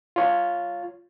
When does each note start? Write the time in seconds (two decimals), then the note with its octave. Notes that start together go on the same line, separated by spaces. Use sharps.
0.16 F4 C#5